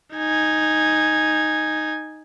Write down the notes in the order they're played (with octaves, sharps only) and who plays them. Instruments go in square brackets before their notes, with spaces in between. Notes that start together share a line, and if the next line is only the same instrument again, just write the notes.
[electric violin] D#4 G#5